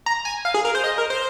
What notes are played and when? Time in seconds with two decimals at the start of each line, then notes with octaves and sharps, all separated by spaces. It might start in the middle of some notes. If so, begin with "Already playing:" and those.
0.06 A#5
0.25 G#5
0.45 F5
0.54 G#4
0.65 A#4
0.75 C5
0.84 D#5
0.98 A#4
1.10 C5